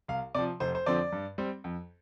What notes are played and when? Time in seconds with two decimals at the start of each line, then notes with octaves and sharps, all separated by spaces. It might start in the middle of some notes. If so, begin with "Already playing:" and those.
0.08 C2 F5
0.35 C3 F3 D5
0.60 F1 C5
0.75 C5
0.86 F2 D3 F3 C4 D5
1.12 G2
1.38 G3 C4
1.64 F2